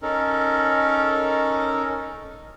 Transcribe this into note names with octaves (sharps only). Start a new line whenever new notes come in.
C#4 D#4 A4 A#4